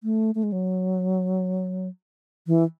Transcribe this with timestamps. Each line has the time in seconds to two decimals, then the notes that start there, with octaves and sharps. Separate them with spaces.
0.04 A3
0.35 A3
0.43 G#3
0.52 F#3
2.47 E3